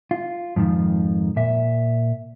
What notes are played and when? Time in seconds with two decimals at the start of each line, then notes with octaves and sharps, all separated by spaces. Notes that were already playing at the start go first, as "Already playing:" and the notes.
0.11 F4
0.56 F2 G#2 D#3 F3
1.36 A#2 E5